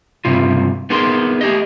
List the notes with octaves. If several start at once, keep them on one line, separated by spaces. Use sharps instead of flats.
C#2 G2 C3 F4
B3 D#4 G#4 A#4 C6
A3 G4 D#5